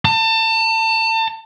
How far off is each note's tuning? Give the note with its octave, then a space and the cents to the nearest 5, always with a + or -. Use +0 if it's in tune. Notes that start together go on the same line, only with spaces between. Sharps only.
A5 +30